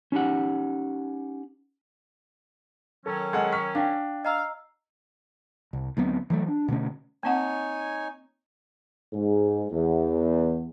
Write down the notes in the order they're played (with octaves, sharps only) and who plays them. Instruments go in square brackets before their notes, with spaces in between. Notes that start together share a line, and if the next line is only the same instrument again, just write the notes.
[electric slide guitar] C#4 D#4 G4 F#5
[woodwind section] D#3 F#3 C#4 [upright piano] A4
[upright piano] G#3 A4 F#5 [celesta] G#6
[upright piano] C#6 F6 B6
[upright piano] D4 [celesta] F5 G5
[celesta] D#5 A#5 E6 [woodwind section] F5
[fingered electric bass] C2
D2 F#3 B3 C4
E3 F#3 A3
D4
B2 D3 A3 C#4
[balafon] A#3 C4 F#5 [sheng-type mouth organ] D#4 C#5 G#5
[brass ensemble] G#2
E2